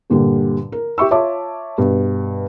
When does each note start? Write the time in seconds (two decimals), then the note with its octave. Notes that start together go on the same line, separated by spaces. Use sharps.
0.10 G2 A#2 D3 G3
0.72 A#4
0.98 G4 E5 C#6 E6
1.11 F4 C#5 E5 A5 D6
1.78 G2 B2